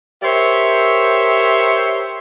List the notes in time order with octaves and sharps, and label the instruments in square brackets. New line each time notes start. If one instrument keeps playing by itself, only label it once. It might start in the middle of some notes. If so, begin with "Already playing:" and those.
[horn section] G4 A#4 C5 C#5 E5